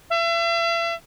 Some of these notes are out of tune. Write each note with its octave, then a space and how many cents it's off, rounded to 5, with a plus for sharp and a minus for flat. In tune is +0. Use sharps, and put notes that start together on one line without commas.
E5 +40